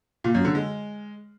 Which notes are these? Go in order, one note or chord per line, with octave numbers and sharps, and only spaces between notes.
A#2
F#2
D3
G#3